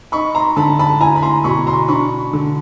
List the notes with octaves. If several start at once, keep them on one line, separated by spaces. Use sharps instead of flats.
D#4 B5 C#6
A#5 C6
D3 A5 B5
A5 B5
E4 G#5 A#5
B5
A#5 C6
B2 B5 C#6
A#5 C6
D4 B5 C#6
D3